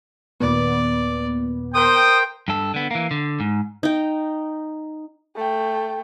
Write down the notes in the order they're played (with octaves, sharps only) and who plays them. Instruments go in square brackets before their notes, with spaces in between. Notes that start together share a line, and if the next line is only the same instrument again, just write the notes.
[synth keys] D#2 A#2 B3 [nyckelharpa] D5
[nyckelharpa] A#4 [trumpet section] C5 G5 [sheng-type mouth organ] D#6
[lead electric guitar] G2 A4
D3 B3
E3 A#3
D3
G#2
[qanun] D#4 G5
[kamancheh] A3 G5